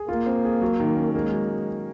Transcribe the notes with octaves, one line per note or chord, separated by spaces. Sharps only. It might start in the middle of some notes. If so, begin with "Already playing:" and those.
Already playing: G#4
A#3 F4
C4
G#4
F#3
D#3
C#4
G#3 A#3
F#3